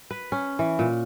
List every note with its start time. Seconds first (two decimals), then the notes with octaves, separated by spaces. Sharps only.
0.11 B4
0.32 C#4
0.59 E3
0.79 A#2